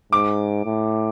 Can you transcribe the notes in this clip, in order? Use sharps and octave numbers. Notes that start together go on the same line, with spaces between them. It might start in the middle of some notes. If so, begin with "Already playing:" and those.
G#2 D6
A2